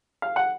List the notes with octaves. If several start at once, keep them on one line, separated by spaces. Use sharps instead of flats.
F5
F#5